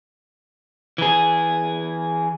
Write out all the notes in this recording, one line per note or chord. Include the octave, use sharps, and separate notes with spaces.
E3 G#4